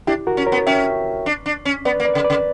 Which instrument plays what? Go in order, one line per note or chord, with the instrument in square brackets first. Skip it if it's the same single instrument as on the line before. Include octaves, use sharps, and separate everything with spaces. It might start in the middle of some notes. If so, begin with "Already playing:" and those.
[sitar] D4 [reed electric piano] E4 G4
[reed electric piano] F#4 A#4
[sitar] C#4
[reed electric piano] A#4 C#5
[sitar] B3
[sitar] C#4 [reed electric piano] E5 G5
[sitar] D4
D4
C#4
[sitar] B3 [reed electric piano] B4 D5
[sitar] A#3
[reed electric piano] B4 D5
[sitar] C#3
[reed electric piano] B4 D5
[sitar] C#3